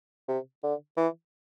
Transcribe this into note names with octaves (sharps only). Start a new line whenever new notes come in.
C3
D3
E3